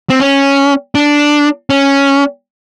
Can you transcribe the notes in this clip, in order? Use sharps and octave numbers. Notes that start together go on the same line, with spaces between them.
C4
C#4
D4
C#4